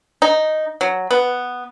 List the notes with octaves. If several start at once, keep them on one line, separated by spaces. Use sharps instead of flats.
D#4
F#3
B3